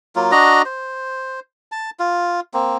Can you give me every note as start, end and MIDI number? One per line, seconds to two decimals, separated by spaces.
0.16 0.31 54
0.16 0.31 58
0.16 0.31 65
0.32 0.62 62
0.32 0.62 66
0.32 0.62 75
0.32 0.62 82
0.66 1.40 72
1.72 1.90 81
1.99 2.40 65
2.54 2.77 58
2.54 2.77 60